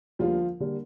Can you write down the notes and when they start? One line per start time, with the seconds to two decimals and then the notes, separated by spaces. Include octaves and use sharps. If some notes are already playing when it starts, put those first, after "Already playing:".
0.19 D2 D3 F3 G3 A#3 F4
0.60 D3 G3 A#3